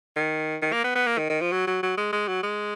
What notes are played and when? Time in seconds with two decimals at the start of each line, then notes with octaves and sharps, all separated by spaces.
0.17 D#3
0.62 D#3
0.73 A#3
0.84 B3
0.96 B3
1.07 A#3
1.18 D#3
1.30 D#3
1.41 F3
1.52 F#3
1.67 F#3
1.83 F#3
1.98 G#3
2.13 G#3
2.28 F#3
2.43 G#3